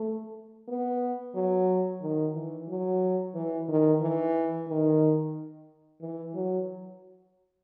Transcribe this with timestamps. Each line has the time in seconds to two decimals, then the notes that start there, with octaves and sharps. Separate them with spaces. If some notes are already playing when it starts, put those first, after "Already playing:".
Already playing: A3
0.68 B3
1.35 F#3
2.02 D#3
2.34 E3
2.68 F#3
3.35 E3
3.69 D#3
4.02 E3
4.68 D#3
6.01 E3
6.34 F#3